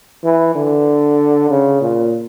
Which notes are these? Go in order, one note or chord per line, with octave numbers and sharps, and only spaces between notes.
E3
D3
C#3
A#2